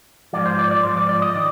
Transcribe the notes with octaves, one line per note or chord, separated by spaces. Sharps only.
G#2 F3 D5
C5
D5
D5
G#2 F3 C5
D5
D5
D#5
D#3 D5